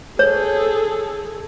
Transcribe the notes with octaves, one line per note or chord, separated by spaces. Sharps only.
G#4 A4 C#5